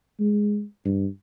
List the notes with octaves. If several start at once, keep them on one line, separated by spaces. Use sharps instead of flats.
G#3
G2